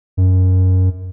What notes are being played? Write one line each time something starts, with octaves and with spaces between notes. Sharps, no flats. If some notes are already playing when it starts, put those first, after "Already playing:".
F#2